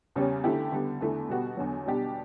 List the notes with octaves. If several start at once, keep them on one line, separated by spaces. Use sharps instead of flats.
E2 C#3 G3 C#4
D3 A3 E4 G4
D3 G3 B3
E2 D3 A3 E4
B2 G3 B3 F#4
E2 D3 F#3
B2 G3 D4 G4